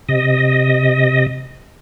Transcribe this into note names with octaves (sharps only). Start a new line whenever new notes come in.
C3 D#5